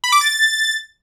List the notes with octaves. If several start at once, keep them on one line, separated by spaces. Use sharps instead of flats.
B5
D6
A6